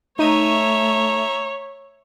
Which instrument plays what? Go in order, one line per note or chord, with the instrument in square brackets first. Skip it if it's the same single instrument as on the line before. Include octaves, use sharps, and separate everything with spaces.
[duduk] A3 [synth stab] D#4 D#7 [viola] C#5 [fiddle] E5 A#5